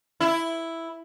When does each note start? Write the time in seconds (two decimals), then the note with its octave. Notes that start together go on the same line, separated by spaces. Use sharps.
0.20 E4